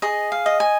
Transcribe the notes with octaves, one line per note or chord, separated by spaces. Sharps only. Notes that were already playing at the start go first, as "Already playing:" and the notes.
G#4 D#5
F5
D#5
G#5